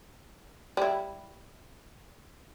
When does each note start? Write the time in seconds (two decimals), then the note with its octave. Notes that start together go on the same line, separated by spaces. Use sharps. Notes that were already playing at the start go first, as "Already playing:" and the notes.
0.77 G3 E4